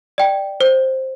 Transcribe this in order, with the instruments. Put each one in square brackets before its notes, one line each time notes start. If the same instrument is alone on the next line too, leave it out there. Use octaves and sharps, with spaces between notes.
[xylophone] D5 G5
C5